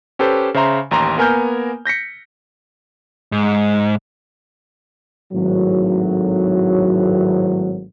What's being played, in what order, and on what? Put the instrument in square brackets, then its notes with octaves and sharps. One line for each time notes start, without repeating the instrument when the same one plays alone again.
[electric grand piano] C#4 G4 A4 B4 C5
C#3 C5 E5 A#5 C6
A1 D#2 A#5 C6
A#3 B3 A#4 G#5 F6 G6
G6 A#6 B6 C#7
[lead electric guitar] G#2
[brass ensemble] G#1 A2 F#3